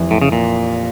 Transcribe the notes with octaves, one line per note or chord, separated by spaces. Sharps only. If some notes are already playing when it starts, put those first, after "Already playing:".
Already playing: F1 F2 E3
A2
C#3
A#2